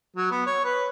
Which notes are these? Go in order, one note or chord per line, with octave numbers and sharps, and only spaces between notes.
F#3
B3
C#5
B4